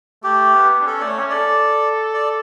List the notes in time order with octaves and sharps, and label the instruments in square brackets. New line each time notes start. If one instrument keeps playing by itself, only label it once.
[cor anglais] A3 [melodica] G4
[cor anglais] B3
D4
[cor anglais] C#4 [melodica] A4
[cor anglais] A3 [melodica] D5
[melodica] C#5
[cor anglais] C#4
[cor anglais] A4 [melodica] D5
[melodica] D5